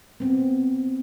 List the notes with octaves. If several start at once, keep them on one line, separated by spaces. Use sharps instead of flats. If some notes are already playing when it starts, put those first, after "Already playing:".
B3 C4